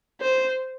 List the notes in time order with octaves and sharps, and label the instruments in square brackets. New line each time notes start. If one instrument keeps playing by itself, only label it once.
[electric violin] C5